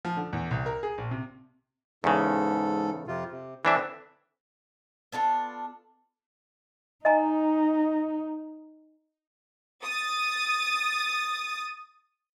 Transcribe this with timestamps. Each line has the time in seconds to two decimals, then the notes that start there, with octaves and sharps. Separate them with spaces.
0.05 F3
0.17 D3
0.33 E2
0.51 C2
0.66 A#4
0.83 G#4
0.98 A#1
1.11 C3
2.04 E2 G#2 C#3 A4
3.08 F2 C3 F4
3.31 C3
3.65 D3 E3 C4 D4 B4 E5
5.12 B3 D4 F4 A4
7.05 D#4 D#5 G#5 A#5
9.83 D#6 A6